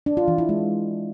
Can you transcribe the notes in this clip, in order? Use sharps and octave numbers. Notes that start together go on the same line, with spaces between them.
D4
F4
E3
E4
G#3